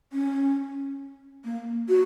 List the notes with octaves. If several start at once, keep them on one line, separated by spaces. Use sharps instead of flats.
C#4
A#3
F#4